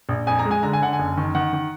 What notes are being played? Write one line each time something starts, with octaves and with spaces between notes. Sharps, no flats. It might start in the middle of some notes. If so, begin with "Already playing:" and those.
A#1
F2 G#5
A#5
G#3
G#5
D3 A#5
G#5
D3 F#5
G#5
F#1
D#3
D#3 F#5
D#3